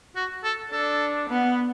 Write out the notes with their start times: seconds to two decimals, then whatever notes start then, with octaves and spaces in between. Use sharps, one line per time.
0.16 F#4
0.44 A4
0.72 D4 A4
1.30 B3